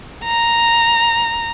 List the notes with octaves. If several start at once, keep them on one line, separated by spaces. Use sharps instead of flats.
A#5